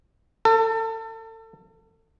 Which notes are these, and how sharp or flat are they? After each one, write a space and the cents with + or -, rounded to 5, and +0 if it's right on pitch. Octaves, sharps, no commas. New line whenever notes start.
A4 +30